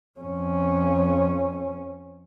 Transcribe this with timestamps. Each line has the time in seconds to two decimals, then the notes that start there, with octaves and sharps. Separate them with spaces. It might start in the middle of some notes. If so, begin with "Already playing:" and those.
0.20 F2 C#4